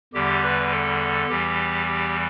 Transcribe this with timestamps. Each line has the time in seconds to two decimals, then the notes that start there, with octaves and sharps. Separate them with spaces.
0.14 E2 D3 G3 G4
0.43 B4
0.71 A4
1.28 E2 E3 G3 G4
1.86 G4